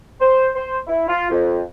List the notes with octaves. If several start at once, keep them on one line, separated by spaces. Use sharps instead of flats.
C5
C5
E4
F4
F2